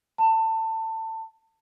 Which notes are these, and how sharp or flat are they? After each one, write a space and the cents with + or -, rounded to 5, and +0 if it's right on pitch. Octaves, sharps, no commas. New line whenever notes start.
A5 +25